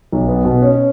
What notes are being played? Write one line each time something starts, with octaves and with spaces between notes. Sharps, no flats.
B1
B3
B2 B3
C#4